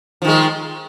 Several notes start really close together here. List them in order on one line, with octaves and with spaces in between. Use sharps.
F3 D#3 G#3